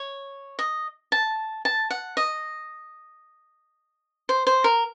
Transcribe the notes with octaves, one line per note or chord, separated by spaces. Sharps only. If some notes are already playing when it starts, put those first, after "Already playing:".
Already playing: C#5
D#5
A5
A5
F#5
D#5
C5
C5
A#4